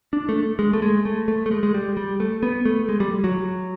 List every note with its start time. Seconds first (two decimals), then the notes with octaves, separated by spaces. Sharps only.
0.13 D4
0.29 A3
0.59 G#3
0.73 A3
0.82 G#3
1.05 A3
1.28 A3
1.46 A3
1.51 G#3
1.63 G#3
1.74 G3
1.97 G3
2.20 A3
2.43 B3
2.65 A3
2.89 G#3
3.00 G3
3.24 F#3